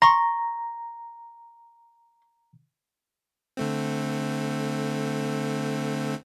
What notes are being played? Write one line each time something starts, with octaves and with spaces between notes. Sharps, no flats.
A#5 C6 C#6
D3 A3 C4